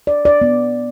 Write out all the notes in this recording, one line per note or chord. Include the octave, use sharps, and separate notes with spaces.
D5
D5
B3